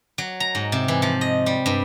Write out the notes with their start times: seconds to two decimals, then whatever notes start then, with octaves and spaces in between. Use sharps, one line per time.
0.18 F#3
0.40 A#5
0.55 G#2
0.72 C3
0.88 E3
1.02 F3
1.21 D#5
1.46 G3
1.66 G2